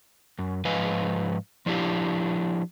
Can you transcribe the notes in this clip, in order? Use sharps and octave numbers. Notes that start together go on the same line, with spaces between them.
F#2
G#2 F3 B4 D#5 F5 G#5
F3 D4 E4 G4 F5